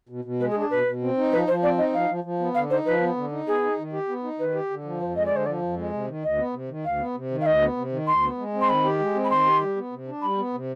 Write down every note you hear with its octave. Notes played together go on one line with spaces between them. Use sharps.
B2
B2
G#3 B4
G#4
D4
G#4
B2 B4
B2
C4
D#4
F3 B4
F3 C5
C4 D5
D#4 D#5
F3 F5
F3
F3
B3
D3 F5
D#4 C5
F3 B4
B3
D3
D#4
B3 G#4
D#4
D#3
G4
B3
D#4
D#3 B4
G4
D3
F3
F2 C5
G#3 D#5
D3 D5
C5
F3 D5
F2
G#3
C3
D#3
D2 D#5
B3
C3
D#3
D2 F5
B3
C3
D#3
F5
D2 D#5
B3
C3
D#3
D2 C6
B3
G#3
C4
C6
D#3 B5
G4
G#3
C4
B5
D#3 C6
G4
G3
B3
C3
D4
G3 B5
B3
C3